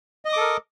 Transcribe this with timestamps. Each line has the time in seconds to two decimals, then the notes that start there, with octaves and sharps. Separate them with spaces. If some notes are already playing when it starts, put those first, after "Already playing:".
0.25 D#5
0.29 D#6
0.33 D6
0.37 A4
0.40 A#4